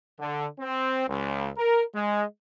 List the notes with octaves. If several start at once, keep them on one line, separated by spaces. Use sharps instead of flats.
D3
C4
C#2
A#4
G#3